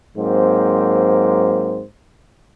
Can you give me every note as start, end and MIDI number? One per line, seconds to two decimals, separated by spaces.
0.18 1.83 44
0.18 1.83 54
0.18 1.83 58
0.18 1.83 60
0.18 1.83 72